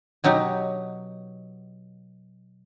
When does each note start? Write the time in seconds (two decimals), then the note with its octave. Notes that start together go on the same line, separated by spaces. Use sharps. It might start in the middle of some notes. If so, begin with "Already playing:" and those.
0.24 B2 F#3 D#4 F#4 G4